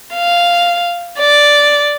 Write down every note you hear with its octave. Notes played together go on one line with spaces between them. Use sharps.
F5
D5